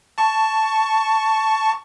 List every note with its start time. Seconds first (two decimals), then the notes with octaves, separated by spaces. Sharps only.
0.18 A5 C#6